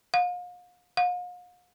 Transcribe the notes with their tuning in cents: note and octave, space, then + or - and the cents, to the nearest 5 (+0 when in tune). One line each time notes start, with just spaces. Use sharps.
F5 +40
F5 +45